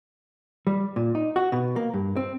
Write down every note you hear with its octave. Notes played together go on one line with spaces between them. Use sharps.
G3
A#2
D#4
F#4
B2
A#3
G2
C4